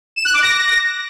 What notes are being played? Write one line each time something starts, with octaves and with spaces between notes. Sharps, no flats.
E7
F#6
D6
A#6